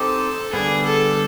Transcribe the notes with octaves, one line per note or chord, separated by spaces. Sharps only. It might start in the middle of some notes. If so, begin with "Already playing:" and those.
Already playing: C4 D#4 G4 A4 C5
D3 G3 B3 G#4
A4